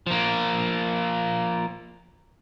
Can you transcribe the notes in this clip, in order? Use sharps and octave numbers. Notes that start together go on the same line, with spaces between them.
F3 A#3